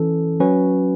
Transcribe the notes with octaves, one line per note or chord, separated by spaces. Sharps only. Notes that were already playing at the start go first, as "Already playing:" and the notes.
Already playing: E3 C#4 A4
F#3 C#4 F#4 B4